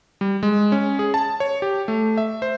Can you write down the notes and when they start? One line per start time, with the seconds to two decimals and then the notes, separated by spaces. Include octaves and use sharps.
0.21 G3
0.43 G#3
0.72 C#4
0.99 G#4
1.14 A5
1.40 C#5
1.62 G4
1.88 A3
2.18 E5
2.42 C5